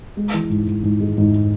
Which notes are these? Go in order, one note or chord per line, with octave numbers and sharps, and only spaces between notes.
G#3
E3
G#2
G#2
G#2
G#3
G#2